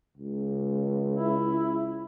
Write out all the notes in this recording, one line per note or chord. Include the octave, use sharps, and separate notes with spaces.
C#2
E4